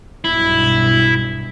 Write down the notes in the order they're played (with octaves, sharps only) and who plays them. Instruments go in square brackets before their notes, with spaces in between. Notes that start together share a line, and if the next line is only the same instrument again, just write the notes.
[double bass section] B1 G2 B2 [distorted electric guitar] E4